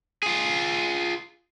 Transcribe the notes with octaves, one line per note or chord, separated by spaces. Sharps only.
F4 G#4